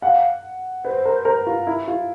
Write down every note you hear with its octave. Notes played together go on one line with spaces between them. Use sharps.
F5 F#5
B4 C5
A#4
A#4
F4
E4
F4